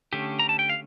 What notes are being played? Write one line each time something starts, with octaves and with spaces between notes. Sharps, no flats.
D3 A3 C#4 G4
A#5
A5
G5
F5